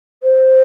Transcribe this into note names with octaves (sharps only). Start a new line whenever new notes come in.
C5